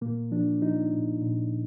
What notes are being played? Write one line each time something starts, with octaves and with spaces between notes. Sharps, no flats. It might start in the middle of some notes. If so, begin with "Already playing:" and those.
A#2 A#3
F3 D4
F3 D#4
A#2
A#2